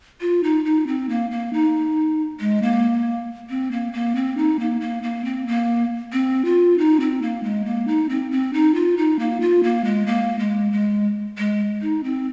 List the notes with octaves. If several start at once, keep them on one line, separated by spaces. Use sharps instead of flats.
F4
D#4
D#4
C4
A#3
A#3
D#4
G#3
A#3
C4
A#3
A#3
C4
D#4
A#3
A#3
A#3
C4
A#3
C4
F4
D#4
C4
A#3
G#3
A#3
D#4
C4
C4
D#4
F4
D#4
A#3
F4
A#3
G#3
A#3
G#3
G#3
G#3
D#4
C4